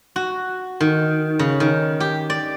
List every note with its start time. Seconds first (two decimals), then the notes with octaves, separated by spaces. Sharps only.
0.16 F#4
0.80 D#3
1.39 C#3
1.60 D#3
2.00 G4
2.30 D5